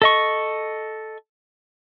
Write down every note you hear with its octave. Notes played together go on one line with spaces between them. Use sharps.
A4 D#5 C#6